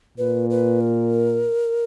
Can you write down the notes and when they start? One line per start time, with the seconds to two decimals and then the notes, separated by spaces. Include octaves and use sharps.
0.18 A#2 B4
0.50 B4
0.81 A#4